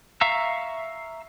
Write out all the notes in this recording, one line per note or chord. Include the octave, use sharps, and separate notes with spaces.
E5 F5 A#5 C#6 E6